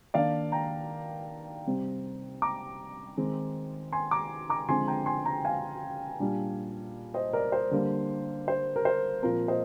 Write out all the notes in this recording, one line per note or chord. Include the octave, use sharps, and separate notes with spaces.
D#3 A#3 D4 D5 F5
G5 A#5
C3 G3 C4
A#5 D6
D#3 G#3 C4
G#5 C6
A#5 D6
A#5 D6
D3 F3 G#3 C4 G#5 C6
G5 A#5
G#5 C6
G5 A#5
F5 G#5
A#2 G3 D4
C5 D#5
A#4 D5
C5
D3 G3 A#3
C5
A#4
C5
A#2 F3 C4 A#4
C5 D#5